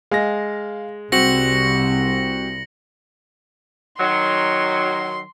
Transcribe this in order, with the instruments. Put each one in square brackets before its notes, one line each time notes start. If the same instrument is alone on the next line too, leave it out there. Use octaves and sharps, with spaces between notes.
[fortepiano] G#3 [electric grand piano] F5 A#6
[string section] C2 [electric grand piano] C4 F#4 [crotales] A#6 C#7 F#7
[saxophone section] D#3 F#3 [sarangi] C6